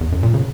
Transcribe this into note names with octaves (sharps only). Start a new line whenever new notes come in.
E2
F#2
A#2
C#3